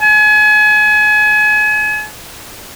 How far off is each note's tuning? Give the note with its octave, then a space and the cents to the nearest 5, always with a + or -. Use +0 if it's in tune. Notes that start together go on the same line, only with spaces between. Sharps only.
G#5 +35